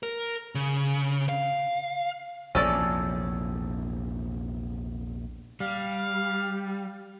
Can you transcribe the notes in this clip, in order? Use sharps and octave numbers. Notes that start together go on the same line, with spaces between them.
A#4
C#3
F5
A#1 E2 C3 C#4 A4 D5
G3 F5